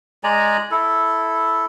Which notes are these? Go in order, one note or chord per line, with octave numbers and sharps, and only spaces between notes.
G#3 D5 G#5 A#5
E4 A4